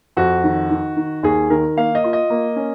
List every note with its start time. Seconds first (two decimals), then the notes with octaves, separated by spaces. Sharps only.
0.17 F2 F#4
0.44 D#3
0.70 D#3
0.97 D#3
1.23 D#2 G#4
1.50 D#3 A#4
1.77 A#3 F5
1.95 D#5
2.04 F4
2.13 D#5
2.30 A#3
2.56 C#4